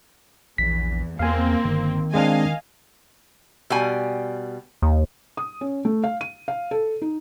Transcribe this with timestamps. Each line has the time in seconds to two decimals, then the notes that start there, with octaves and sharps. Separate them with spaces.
0.58 A#1 E2 B6
1.19 E2 A#3 C4 F5 G#5
1.64 G1 D#3
2.14 G#3 C4 D4 D#5 F5 G#5
3.70 B2 G3 G#5
4.82 D#2
5.37 D#6
5.61 C#4
5.85 A3
6.04 F5
6.21 D#7
6.48 F5
6.71 A4
7.02 D#4